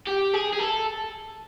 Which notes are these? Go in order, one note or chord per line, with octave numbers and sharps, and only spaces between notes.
G4
G#4
G#4
A4